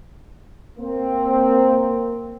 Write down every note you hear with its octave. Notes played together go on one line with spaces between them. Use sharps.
A#3 C4